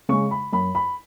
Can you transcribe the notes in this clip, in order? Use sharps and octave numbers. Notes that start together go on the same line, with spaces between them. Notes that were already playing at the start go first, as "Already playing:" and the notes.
C#3 G#3 C#6
B5
F#2 B5
B5